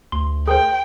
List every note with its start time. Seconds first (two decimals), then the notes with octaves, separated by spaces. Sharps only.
0.12 D2 C6
0.48 G#4 A#4 C5 G5